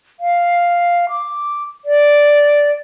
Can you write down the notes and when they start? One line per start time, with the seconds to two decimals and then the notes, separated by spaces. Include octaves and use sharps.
0.20 F5
1.09 D6
1.85 D5